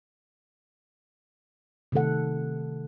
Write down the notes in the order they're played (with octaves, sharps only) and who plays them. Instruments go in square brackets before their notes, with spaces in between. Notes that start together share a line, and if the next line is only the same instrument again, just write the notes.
[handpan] C3 D#3 A3 A4 F#5